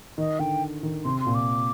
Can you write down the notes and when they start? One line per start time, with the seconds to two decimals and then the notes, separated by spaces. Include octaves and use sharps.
0.18 D#3 D#5
0.39 D3 G5
0.83 D#3
1.05 C3 C6
1.20 C6
1.26 A#2
1.35 D6